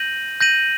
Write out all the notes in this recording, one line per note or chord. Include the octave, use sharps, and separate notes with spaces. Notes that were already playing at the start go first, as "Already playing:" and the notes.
Already playing: G6 A#6 D#7 F#7
G6 A#6 D#7 F#7